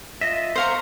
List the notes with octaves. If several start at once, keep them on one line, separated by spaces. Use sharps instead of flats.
F4 D#5 E5
C5 F5 A#5 C6 C#6